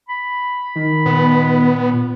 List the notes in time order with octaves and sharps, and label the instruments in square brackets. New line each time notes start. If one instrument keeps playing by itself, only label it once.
[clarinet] B5
[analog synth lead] D#3
[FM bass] A#2 [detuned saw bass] B3